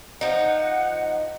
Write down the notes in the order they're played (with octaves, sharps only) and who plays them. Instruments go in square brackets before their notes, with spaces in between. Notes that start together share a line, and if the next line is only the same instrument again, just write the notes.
[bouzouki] F3 D#4 [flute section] F#5